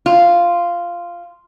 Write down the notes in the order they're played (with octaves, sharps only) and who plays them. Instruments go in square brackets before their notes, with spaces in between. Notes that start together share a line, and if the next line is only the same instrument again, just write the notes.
[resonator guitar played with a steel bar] F4